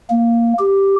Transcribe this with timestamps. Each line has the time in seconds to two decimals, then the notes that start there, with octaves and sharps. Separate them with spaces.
0.10 A#3
0.59 G4